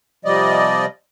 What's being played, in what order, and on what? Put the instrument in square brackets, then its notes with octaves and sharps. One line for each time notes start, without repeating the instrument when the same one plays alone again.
[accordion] C3 F3 G3 D5 D#5